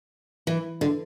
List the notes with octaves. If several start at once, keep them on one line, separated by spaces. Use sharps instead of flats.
E3
D3